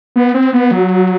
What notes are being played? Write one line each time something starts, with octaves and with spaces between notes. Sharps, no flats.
B3
C4
B3
F#3